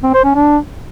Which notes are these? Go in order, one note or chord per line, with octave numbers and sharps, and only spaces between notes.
C4
C5
C#4
D4